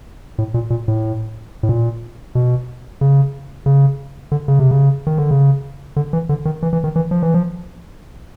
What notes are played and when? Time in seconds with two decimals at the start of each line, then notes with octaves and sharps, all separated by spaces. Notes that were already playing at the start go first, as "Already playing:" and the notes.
0.38 A2
0.54 A#2
0.70 A#2
0.88 A2
1.63 A2
1.69 A#2
2.35 B2
3.01 C#3
3.66 C#3
4.32 D3
4.48 C#3
4.59 C3
4.71 C#3
5.07 D#3
5.18 D3
5.31 C#3
5.96 D3
6.13 E3
6.29 D3
6.45 D#3
6.63 E3
6.73 E3
6.84 D#3
6.96 E3
7.11 F3
7.23 E3
7.34 F3